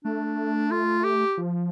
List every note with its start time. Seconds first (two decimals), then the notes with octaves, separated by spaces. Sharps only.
0.04 A3 D4
0.72 F4
1.04 G4
1.38 F3